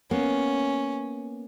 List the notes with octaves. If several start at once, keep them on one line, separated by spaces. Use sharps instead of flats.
A#3 B3 C#4